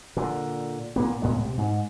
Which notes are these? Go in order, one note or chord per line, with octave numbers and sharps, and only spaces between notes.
A#2 D3
A#2 A#3 B3
C#2 A2 G#3 B3
C3
G#2